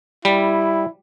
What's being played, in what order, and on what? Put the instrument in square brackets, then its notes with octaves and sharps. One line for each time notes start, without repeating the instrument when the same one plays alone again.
[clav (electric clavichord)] G3 [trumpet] E4